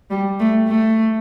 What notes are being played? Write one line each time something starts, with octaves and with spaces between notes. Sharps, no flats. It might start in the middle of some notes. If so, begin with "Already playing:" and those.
G3
A3
A3